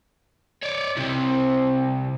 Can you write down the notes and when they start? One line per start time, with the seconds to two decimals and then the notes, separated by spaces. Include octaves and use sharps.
0.63 C#5 D5
0.97 C3 C4 E4